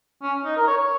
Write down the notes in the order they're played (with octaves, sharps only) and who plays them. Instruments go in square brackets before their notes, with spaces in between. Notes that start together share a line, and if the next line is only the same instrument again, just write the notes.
[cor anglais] C#4
D#4
A#4
C#5
C#5